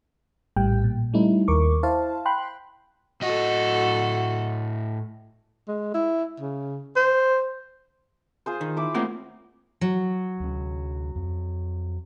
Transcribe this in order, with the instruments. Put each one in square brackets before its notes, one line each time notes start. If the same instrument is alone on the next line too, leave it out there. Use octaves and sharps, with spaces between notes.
[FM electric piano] A#1 A2 G3 G5
A#2
G3 A3 C#4 D#4 E4
D#2 A#4 C#6 D6
E4 C5 F5 A5
G5 B5 C6 F#6
[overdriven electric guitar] A2 D#5 [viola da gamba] F#4 A4
[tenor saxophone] G#3
E4
C#3
C5
[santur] F4 G#4 C5
[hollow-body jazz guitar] D#3
[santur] E4 B5 D6
[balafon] A3 F4 [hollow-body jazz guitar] A#3 C4 C#4 [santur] C5
[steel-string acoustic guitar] F#3
[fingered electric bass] D2 C#4
F2